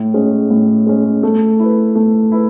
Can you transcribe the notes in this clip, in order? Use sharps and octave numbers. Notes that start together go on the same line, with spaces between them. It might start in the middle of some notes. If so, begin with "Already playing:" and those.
Already playing: A2
G#3 C#4
A2
G#3 C#4
A3
E4 B4
A3
E4 B4